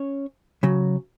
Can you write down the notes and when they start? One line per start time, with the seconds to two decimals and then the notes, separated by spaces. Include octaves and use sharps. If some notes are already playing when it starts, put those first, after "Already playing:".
Already playing: C#4 C#5
0.63 C#3 F#3